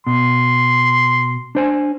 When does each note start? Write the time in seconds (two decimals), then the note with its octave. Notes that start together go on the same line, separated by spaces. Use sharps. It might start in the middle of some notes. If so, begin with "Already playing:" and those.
0.07 B2 C6
1.55 D4 C5 G#5